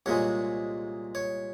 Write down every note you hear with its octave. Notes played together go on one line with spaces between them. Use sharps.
C2 A#2 G#3 C#5
C#5